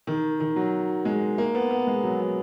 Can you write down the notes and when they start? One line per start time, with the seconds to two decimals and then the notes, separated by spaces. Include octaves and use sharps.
0.07 D#3
0.40 D#3
0.56 F#3
1.05 G#3
1.38 A#3
1.55 B3
1.71 B3
1.87 G#3
2.03 F#3
2.20 F#3